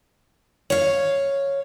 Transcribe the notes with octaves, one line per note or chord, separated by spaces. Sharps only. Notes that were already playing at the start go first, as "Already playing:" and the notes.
C#5 F5